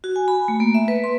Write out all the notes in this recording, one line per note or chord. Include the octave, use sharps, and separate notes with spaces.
F#4
G#5
B5
A3
A#3
E5
B4
C6